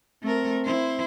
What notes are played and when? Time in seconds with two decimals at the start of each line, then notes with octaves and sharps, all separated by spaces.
0.23 A3 C4 A#4
0.65 E4 C5